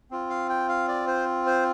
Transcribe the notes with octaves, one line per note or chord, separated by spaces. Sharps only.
C4 F4
F5
G5
F5
D5
C5
C5